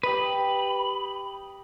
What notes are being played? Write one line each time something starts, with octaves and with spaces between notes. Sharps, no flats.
G4 B4 D#5 A#5 B5